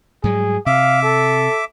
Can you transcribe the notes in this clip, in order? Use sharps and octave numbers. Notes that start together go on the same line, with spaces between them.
G#2 F#3 G3 G#4
C3 E5 F5 D6
A4